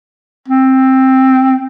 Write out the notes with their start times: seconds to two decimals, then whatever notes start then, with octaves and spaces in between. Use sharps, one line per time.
0.49 C4